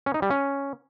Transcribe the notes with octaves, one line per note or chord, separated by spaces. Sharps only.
C#4
D#4
G3
C#4